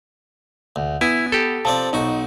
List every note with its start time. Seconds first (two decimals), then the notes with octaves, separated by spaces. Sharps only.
0.76 D2
1.01 B3 E4 G#5
1.32 G4 A4
1.65 F3 C4 D5 A5
1.93 B1 D#4 F#4 C#6